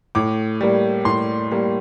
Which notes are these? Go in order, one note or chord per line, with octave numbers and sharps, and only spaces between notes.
A2 D6
G3 A#3
A2 C6
G3 A#3